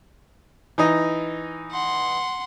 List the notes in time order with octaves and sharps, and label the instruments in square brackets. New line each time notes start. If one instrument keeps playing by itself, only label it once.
[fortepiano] E3 D#4 D#5
[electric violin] F#5 C6